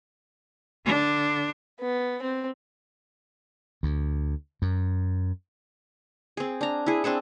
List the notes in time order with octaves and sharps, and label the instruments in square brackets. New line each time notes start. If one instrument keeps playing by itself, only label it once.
[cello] D3 D4
[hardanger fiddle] B3
C4
[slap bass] D2
F#2
[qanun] C4 G#4
D4 A#5
E4 G#4
C4 D4 G#4 A4